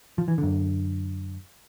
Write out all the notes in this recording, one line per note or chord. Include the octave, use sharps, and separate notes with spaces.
F3
E3
F#2 D3